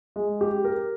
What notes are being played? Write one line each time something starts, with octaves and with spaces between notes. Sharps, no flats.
G#3
G4
A#4